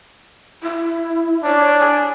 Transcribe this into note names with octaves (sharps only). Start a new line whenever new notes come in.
E4
D4 C#5
G#5